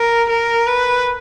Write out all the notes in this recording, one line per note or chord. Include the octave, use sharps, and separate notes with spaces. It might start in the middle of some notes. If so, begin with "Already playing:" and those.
Already playing: A#4
A#4
B4